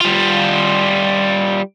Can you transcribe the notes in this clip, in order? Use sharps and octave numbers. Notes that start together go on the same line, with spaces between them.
G3 F4